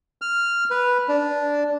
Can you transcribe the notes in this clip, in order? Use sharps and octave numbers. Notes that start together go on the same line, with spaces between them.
F6
B4
D4